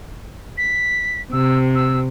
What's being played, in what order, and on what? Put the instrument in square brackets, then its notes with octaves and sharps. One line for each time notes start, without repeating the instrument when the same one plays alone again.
[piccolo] B6
[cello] C3 [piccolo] E6
[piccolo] E6